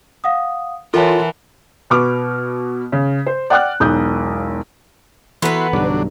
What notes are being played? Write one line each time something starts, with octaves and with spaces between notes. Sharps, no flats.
F5 F#5 D#6
E3 F4 A4 A#4 C#5 F#5 A5
B2 B3 C#6 D6 F6
C#3
C5
D5 F#5 G5 D6 F6 F#6
E1 B1 D#6 G6
E3 B3 E4 F#4 A4 B4 A#5 C6
B1 G2 D3 F#3 D4